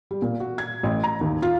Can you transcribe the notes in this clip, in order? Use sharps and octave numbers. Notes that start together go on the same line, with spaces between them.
G3
A#2
F#4
G#6
A1
A#5
D#2
F4